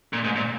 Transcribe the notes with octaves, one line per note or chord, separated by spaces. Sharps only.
A#2
G#2
A#2